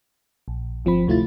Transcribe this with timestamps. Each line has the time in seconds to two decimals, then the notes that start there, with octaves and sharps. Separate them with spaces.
0.48 A#1
0.85 G1 F3 C4 B5
1.07 D2 C3 A3 E4 F4 A6